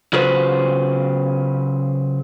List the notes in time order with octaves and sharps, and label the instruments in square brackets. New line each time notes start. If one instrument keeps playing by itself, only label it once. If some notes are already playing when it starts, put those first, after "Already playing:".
[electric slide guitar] C#3 F#3 F4 G#4 B4 C5